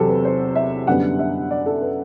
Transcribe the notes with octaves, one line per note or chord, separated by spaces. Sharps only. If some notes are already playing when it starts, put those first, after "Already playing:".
Already playing: E2 C3 F#3 C4 G4 A4
B4
C5
E5
F#2 D3 G3 B3 F#5
E5
D5
A4
B4